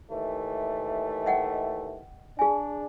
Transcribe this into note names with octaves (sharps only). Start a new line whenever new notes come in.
D#2 E3 A3
D#5 F#5 G5
D4 G#4 G#5